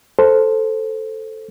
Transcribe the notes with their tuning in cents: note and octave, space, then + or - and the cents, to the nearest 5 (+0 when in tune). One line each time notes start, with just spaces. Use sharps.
A4 +0 C5 +0